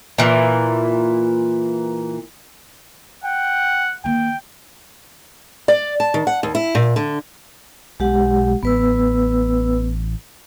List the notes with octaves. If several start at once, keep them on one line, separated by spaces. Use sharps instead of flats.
A#2 E3
F#5 G5
D#3 A#3 G5
D5
A5
D#3
F#5
D#2
E4
A#2
D3
B1 G#3 G4 F#5
A1 B3 B4 E6